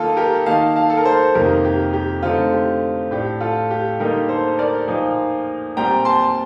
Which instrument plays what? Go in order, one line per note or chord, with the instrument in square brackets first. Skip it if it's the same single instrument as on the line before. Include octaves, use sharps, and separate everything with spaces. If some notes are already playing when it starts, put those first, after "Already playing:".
Already playing: [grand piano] D#3 A#3 D#4 F4 A4
G4 A#4
D#3 A#3 D#4 F5 A5
F5 A5
A4
A#4
A4 C5
F2 C3 D#3 A#3 D#4 G4 A#4
G4
G4
D3 A3 C4 D#4 F4
G4
A2 A3 D4 G4
F4 A4
G4
D3 G3 A#3 D#4 G4 A#4
A4 C5
A#4 D5
A#2 F3 A#3 D#4
A#2 G3 C4 G5 A#5
A5 C6